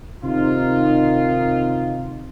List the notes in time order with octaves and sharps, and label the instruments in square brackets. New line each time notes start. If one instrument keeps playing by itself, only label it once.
[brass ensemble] C3 D#3 D#4 F4